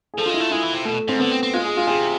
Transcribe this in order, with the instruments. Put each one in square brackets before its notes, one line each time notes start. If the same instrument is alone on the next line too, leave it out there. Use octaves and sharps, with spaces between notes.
[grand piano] G#4
[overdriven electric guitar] F3 [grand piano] A4
[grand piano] F4
[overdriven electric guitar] G#3
[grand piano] E4
[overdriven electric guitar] A3
[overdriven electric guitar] G#3 [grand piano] E4
[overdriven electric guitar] E3
C3
[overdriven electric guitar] B2 [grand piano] A3
[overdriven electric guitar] G#2 [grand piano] C4
[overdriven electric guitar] D3 [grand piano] B3
[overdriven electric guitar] C4
C4
[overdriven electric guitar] G#3 [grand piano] F4
[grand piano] G#4
F4
[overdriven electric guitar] C3 [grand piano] G#4